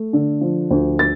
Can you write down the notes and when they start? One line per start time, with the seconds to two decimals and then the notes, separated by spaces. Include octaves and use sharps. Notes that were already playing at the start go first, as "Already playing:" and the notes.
Already playing: A3
0.13 D3
0.41 F3
0.71 D2
0.99 A6